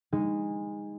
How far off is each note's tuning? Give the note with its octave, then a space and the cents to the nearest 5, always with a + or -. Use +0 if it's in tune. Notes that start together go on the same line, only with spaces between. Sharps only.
G#3 -25 D#4 +0